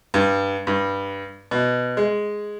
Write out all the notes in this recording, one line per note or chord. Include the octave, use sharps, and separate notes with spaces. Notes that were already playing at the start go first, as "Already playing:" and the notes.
G2
G2
B2
G#3